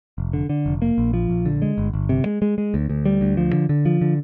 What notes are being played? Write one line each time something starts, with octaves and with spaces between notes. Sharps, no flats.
F1
D3
D3
F1
A#3
A#1
F3
A#1
D3
G#3
G1
G1
C3
G#3
G#3
G#3
D2
D2
G3
D2
F3
D3
D3
F3
D3